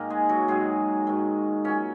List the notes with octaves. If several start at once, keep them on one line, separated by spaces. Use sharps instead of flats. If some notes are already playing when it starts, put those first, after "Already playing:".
Already playing: G#2 D#3 A#3 A#4
G#3 G#4
F#3 F#4
G#2 D#3 F#3 G#3 G#4
G#2 D#3 F#3
A#2 F#3 C#4